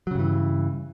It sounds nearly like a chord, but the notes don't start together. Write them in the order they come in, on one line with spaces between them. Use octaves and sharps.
F#3 C#3 G2 E3